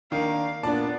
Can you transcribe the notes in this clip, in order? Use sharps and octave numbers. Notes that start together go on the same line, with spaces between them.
D#3 A#3 D4 F5
A#2 B3 D4 D5 A5